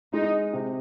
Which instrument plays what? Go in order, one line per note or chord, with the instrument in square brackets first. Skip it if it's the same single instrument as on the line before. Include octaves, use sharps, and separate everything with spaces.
[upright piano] G#3 [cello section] D#4
[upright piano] C3